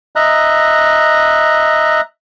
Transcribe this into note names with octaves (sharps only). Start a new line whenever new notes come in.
D#5 E5 A#5 F#6